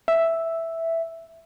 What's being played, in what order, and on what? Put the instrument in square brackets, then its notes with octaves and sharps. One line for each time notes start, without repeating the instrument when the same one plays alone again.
[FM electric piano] E5